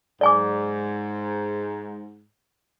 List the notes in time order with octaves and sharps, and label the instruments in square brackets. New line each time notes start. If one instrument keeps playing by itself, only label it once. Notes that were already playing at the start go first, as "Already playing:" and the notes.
[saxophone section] G#2 [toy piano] D5 G#5 D6